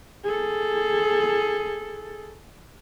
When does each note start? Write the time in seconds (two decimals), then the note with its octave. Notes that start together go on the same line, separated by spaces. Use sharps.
0.24 G#4 A4